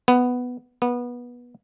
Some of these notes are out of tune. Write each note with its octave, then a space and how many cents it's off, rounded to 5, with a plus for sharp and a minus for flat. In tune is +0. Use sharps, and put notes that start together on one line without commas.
B3 +5
B3 -20